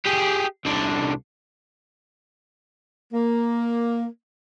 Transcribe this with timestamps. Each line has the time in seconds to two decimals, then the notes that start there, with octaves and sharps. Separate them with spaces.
0.06 G4 G#4
0.65 C2 D3
3.13 A#3